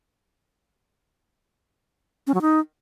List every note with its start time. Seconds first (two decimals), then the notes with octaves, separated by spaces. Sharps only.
2.27 C#4
2.34 F#3
2.41 D#4